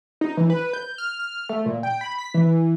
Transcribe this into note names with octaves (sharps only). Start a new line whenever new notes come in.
D#4
E3
B4
G6
F6
F6
A3
A#2
G5
B5
B6
E3